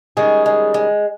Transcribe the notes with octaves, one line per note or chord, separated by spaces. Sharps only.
D#3 G3 G#3 C#4 G#4
G#3
G#3